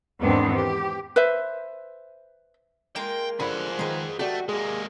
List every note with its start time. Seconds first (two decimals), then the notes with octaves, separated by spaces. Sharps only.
0.21 E2 G#2 D#3 B3 C4 D4
0.56 G4
1.16 B4 C5 E5
2.96 G#3 A#3 F4 G5
3.40 D3 F3 G#4 F#5 B5
3.79 D#3 G#3 D#4 B4
4.19 A3 F#4 G4 A4 D5
4.49 G#3 A#3 G#4